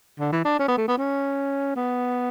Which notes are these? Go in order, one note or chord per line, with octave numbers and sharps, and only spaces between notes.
D3
E3
D4
C#4
B3
A3
B3
C#4
B3